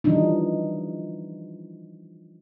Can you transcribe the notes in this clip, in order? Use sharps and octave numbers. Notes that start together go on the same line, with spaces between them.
E3 F3 G3 D4 D#4